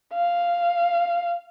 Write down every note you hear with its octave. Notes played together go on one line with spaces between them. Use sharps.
F5